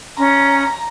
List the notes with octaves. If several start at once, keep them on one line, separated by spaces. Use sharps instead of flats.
C#4 A#5